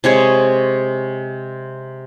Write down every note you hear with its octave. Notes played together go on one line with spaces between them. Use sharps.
C3 G#3 C#5